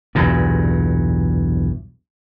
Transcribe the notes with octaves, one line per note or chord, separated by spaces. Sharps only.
B1 E2 G2 A#2